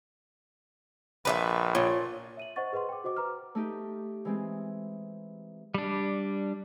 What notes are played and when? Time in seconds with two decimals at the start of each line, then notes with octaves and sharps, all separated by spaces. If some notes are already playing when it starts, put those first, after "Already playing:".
1.25 A#1 B4 D5 E5
1.75 A#2 F4 C#5
2.37 E5 D#7 F#7
2.56 C5 D#5 F#5 C#6 A6
2.73 G#4 B4 D#5 F#5 C6
2.89 G5 D6
3.04 F#4 C5 D#5 D6
3.16 B4 A#5 D6 F6
3.55 A3 D#4 G4
4.25 E3 G#3 C4
5.74 G3 D4